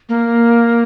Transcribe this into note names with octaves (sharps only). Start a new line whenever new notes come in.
A#3